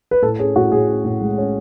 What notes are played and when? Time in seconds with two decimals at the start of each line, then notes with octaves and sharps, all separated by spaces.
0.11 B4
0.22 A2 A4
0.39 C#4 G#4
0.55 A2 F#4
0.72 A2 G#4
0.88 C#4
1.05 A2
1.21 G#3
1.38 C#4